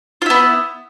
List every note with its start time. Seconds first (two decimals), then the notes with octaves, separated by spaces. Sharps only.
0.22 F4
0.26 E4
0.30 B3